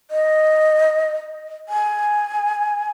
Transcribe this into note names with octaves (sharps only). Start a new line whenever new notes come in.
D#5
G#5